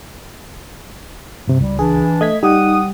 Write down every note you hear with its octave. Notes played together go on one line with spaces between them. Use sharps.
G2 C3
C#2 G3
E3 D4 G#4
A3 D#5 G#6 B6
G3 D#4 G4 F#5 D#6